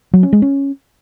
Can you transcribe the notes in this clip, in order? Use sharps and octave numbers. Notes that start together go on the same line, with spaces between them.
F#3
C#4
G#3
C#4